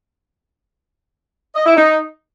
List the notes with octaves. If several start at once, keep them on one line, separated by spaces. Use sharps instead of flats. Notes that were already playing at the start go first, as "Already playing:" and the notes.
D#5
E4
D#4